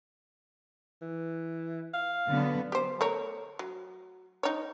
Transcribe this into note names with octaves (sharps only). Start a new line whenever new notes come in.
E3
F5
D3 F#3 B3
G4 C5
A3 A#4 C#5
F#3
D#4 C#5